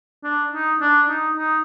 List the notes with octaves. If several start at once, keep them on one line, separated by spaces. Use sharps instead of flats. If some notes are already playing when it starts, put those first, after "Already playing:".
D4
D#4
D4
D#4
D#4